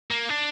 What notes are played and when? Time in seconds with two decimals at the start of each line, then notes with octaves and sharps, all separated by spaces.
0.11 A#3
0.29 D4